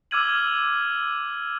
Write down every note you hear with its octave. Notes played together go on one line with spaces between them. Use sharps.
D6 E6 F6 G#6 D#7 F#7